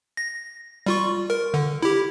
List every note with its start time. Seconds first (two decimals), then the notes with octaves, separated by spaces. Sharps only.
0.17 A#6
0.86 G3 F4 C#6
1.30 A#4
1.54 D3
1.82 E4 G4